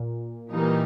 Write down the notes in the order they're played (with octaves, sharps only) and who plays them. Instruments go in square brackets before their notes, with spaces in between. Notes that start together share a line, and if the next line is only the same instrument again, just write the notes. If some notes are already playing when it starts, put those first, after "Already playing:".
Already playing: [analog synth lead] A#2
[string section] E3 G3 A#3 D#4